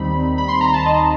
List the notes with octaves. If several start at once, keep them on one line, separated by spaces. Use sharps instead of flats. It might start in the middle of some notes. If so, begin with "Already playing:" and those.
Already playing: D#2 D#3 G3 C4 D#4 B5
B5
C6
A#5
A5
D#5